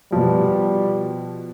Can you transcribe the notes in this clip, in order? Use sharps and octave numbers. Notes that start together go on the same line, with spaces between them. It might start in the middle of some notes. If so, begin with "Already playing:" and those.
B2 F3 G3